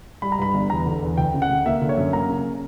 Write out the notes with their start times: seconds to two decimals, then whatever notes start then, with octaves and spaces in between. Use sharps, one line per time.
0.22 G3 B5
0.32 A#5
0.39 G2 B5
0.54 G1
0.70 E2 A#5
0.86 D3
1.02 E2
1.18 D2 G5
1.34 C#3
1.42 F#5
1.50 D2
1.65 A#3 E5
1.81 D3
1.89 C#5
1.97 F#2
2.13 A#3 A#5
2.29 C#3